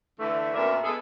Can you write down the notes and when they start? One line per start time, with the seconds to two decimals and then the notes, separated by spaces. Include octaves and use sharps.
0.19 D3 E3 A3
0.54 F#2 A#2 B3 D4 A#4 E5
0.84 G#3 B3 E4 G#4 A4